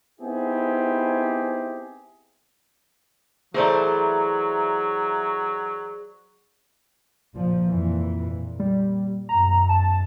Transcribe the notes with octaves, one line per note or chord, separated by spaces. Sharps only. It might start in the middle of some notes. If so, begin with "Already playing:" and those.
B3 C4 D#4 E4 G4 G#4
E3 F#3 A3 G#4 C5 D5 E5 A#5
A#2 F3
F2 A#2 E3
A#2
G3
F#2 B2 A#5
A5